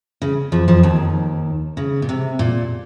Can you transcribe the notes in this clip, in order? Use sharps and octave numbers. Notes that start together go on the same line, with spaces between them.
C#3
F2 F3
F2 F3
D#2 D#3
C#3
A#2
C3
A#2